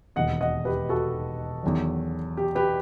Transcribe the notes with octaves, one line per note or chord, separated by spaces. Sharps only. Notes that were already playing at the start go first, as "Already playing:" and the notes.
E1 D#2 D#3 D#5 F#5
D#5 F#5
G4 B4
F#4 A4
E2 D#3 F#3
G4
G4 B4